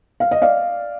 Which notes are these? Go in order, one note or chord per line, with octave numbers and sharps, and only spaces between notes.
F5
D#5
D5 F5